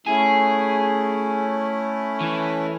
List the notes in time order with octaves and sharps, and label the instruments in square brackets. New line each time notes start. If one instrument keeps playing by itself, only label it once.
[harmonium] A3 C#4 E4 [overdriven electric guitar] G#4
[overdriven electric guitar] E3